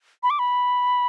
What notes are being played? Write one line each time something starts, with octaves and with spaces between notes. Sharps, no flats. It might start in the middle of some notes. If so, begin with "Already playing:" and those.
B5
D6
B5